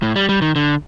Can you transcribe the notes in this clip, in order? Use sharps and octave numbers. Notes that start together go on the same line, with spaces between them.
A2
G3
G3
D#3
D3